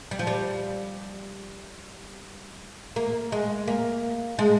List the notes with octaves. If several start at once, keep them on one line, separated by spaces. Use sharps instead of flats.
G3
F3
G3
A#3
G#3
A#3
G#3